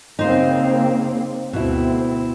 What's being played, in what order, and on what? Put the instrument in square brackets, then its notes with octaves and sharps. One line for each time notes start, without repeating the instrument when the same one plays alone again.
[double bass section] C#3 A#3 C4 [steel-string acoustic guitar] D#4 C5
[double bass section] D2 C4 [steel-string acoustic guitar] B2 E4